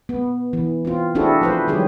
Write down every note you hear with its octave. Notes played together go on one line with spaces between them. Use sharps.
B3
E3
C4 F4
C4 D4 E4 F#4 G#4 A4
F3 B4 C5
D#3 F#3 G3 G4 G#4